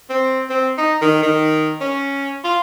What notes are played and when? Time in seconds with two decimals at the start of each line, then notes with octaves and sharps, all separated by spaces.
0.10 C4
0.50 C4
0.78 D#4
1.02 D#3
1.23 D#3
1.81 C#4
2.44 F4